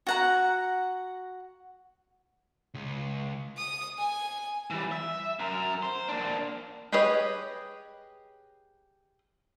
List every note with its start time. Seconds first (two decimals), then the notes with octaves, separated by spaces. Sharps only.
0.07 F#4 F#5 A#5
2.74 C#2
3.57 D#6
3.98 G#5
4.70 E3 G3
4.92 E5
5.40 F#2 A#4
5.83 C5
6.09 A#3 D4
6.92 G4 G#4 B4 C#5 D#5